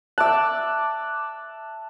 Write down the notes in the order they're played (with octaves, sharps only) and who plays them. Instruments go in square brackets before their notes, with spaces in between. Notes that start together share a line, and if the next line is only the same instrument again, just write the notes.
[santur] E5 A5 [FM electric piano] D6 F#6